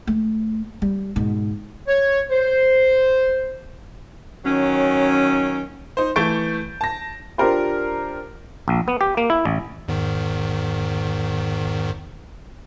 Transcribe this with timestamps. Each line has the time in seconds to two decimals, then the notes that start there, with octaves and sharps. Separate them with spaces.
0.07 A3
0.82 G3
1.16 G#2 B2
1.88 C#5
2.30 C5
4.45 D#3 F#3 C#4
5.97 D#4 C5
6.16 E3 A3 C#6 G6 A6 D7
6.81 A5 A#6
7.38 D4 F4 G4 A#4 C5
8.68 A#1
8.88 B3
9.01 G4
9.17 A#3
9.30 E4
9.45 A1
9.88 E2 G#2 D#3